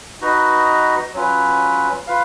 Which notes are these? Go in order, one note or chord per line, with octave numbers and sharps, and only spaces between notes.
D#4 F#4 B4 D#5
F#3 C#4 F4 B4
F4 B4 F5